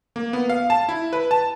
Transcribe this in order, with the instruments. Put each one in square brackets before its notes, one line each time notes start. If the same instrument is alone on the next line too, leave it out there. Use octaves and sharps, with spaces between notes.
[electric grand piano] A#3
B3
F5
A5
E4
B4
A5